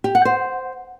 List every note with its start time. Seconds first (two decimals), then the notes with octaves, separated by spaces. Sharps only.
0.04 G4
0.15 F#5
0.25 C5